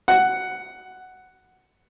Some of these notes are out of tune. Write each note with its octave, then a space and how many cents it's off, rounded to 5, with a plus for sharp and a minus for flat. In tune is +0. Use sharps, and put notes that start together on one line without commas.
F#5 +5